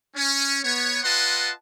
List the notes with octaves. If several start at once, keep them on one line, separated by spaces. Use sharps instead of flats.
C#4
B3 C#5
F4 B4 D#5 F#5 A5 C6